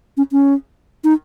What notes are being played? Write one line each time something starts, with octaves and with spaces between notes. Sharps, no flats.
C#4
C#4
D#4